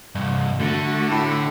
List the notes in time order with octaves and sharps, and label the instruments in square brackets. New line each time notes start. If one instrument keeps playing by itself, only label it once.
[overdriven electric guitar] C2 G2
[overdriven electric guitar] D3 [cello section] A3 F#4
[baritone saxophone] A2